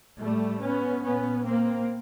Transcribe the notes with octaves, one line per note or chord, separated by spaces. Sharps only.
A2 G3 A3
B3 C#4
A#2 B3 C#4
A#3 C4